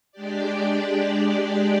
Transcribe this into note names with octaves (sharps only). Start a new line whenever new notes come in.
G#3 D4 G4 D5